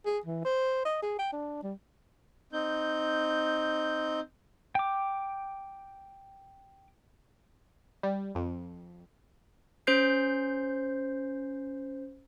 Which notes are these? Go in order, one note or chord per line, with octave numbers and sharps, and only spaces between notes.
G#4
E3
C5
D#5
G#4
G5
D4
G3
C4 D#4 G6
G5 D6
G3
F2
C#4 C5 G6 C7